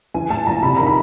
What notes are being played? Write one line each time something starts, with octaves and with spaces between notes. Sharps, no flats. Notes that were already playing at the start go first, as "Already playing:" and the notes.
E3 G#5
A2 A5
A#1 A#5
C3 B5
D#3 A#5
B5